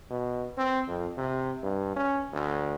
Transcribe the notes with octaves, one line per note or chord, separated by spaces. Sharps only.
B2
C4
F2
C3
G2
C#4
D2